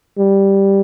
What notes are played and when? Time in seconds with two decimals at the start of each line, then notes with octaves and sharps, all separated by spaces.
0.18 G3